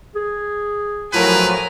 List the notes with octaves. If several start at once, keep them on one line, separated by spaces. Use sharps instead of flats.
G#4
A2 F3 F#3 A#4 B4 G#5 A#5